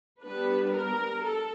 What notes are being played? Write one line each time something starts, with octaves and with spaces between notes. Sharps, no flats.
G3 B3 D4 B4
A#4
A4